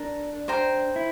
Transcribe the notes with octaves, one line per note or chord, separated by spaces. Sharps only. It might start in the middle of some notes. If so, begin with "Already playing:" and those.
Already playing: D4 A#4
C5 G5 A#5
E4